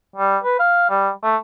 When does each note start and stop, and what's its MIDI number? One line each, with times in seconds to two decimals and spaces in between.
0.16 0.37 55
0.43 0.56 71
0.59 0.89 77
0.89 1.10 55
1.23 1.36 57